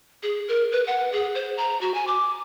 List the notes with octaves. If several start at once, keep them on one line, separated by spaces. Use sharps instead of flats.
G#4
A#4
B4
F#5
G#4
C5
A#5
F#4
G#5
D6